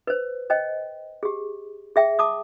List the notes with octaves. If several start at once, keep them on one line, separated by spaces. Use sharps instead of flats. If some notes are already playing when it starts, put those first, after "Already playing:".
B4 C5
C5 D#5 G5
G4 G#4
G#4 E5 G5
A5 D6 D#6